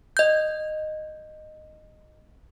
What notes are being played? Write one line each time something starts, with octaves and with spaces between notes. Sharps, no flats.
D#5 G6